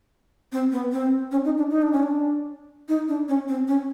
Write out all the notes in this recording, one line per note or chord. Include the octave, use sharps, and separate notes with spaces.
C4
B3
C4
C#4
D#4
D4
D#4
D4
C#4
D4
D#4
D4
C#4
C4
C#4